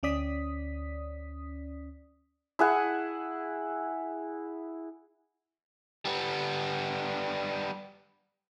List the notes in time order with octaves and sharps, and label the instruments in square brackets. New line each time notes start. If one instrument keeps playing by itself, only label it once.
[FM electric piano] D2 C#4 D5 D#6 B6
[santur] E4 G#4 F#5
[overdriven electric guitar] G3 B3